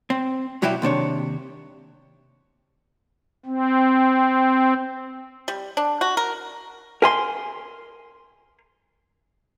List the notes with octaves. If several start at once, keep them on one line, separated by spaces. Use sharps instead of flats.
C4
B1 F#3 G3 E4 F#4 G4
D#2 C3 D4 C#5
C4
G3
D4
F#4
A#4
A#4 G#5 C6